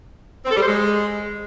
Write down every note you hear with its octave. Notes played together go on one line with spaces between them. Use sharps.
C4
A4
G3
C5
G#3